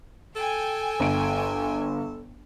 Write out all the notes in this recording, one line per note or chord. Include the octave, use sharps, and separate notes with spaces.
A4 G5 G#5
G1 D7